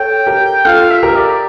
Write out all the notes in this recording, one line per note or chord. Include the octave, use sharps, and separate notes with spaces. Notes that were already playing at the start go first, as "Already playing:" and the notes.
Already playing: A4 C#5 G5
G4 A#4
F4 A4 F5
E5
G4 A#4
D5